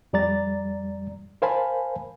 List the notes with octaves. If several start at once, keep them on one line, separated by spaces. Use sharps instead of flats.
F2 G3 D5 A#5 A6
A#4 C5 F5 G#5 A5 B5